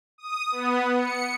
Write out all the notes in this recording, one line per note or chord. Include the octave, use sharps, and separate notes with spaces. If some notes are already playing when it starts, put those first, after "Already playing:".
D#6
B3
C#7